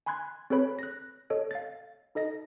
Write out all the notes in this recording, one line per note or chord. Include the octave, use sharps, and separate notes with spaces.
G#5 B5 C6 F#6 G#6
C4 G#4 A4 B4 C#5 B5
F#6 A#6
A4 C#5 D#5
F5 A6
D#4 A4 D#5 A#6